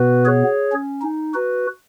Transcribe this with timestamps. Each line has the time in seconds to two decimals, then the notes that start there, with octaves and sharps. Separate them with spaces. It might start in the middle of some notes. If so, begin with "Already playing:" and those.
Already playing: B2 B3 F#4 B4
0.25 G#4 C#5
0.72 C#4
1.02 D#4
1.34 F#4 B4